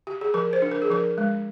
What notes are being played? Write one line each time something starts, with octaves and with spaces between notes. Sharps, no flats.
G4
G#4
F3 A#4
C5
D4
A#4
G#4
F3 A#4
G#3